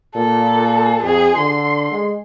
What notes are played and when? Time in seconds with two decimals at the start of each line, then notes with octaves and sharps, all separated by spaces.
0.16 A#2 A4
1.02 F2 G#4
1.37 D3 C6
1.92 G#3